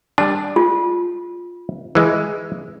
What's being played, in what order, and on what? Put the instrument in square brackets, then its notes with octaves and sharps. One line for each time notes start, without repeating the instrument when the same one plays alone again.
[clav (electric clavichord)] G3 D4 [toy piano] A5
[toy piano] F4
[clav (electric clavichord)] E3 G#3